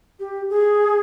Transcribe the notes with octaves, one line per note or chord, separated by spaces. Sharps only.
G4
G#4